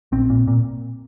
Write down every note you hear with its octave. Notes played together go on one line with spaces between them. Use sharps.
A#1 C4
A#2
A#2